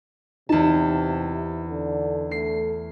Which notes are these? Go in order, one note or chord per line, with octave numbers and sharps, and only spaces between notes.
E2 C3 D#4 A5
D3
A3 C7